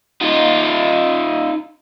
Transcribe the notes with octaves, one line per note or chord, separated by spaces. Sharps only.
D#4 F4